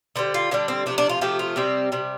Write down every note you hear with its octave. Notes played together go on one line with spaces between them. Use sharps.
D3 G3 C5
F4
D3 G3 D4
C4
C3 F3 A3 D4
D4
F4
C3 F3 A3 G4
F4
C3 G3 C4
C3 G3